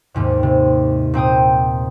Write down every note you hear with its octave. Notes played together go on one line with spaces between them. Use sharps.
D#2 G#2 C3
C3
A#2 C4 G5 D#6